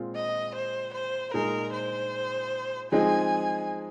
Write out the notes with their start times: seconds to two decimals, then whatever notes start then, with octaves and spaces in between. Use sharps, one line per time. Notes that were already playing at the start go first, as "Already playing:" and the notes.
Already playing: A#2 G#3 C4 F4
0.15 D#5
0.55 C5
0.94 C5
1.34 A#2 G#3 D#4 G#4 A#4
1.73 C5
2.92 F3 G#3 C4 D#4 G#4 G#5